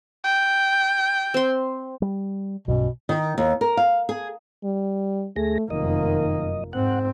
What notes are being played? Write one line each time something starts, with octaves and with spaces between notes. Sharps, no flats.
G5
C4 C6
G3
B1 G2 B2 C#4
D#3
D#2
A#4
F5
G#4
G3
D2 A3 G#4 A#6
F1 F#2 D#3 A#3 D#5
G#2 C4 F#5